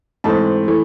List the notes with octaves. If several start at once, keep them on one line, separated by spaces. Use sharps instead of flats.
G#2 E3 A3 C4 A5
E3 A3